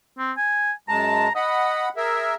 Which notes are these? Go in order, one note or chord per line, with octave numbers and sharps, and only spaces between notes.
C4
G#5
F#2 G#3 A5 A#5
D#5 F#5 B5
G#4 A#4 E5